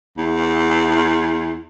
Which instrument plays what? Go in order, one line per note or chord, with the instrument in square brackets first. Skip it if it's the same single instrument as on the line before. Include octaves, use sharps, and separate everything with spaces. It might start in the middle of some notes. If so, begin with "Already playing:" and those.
[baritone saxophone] E2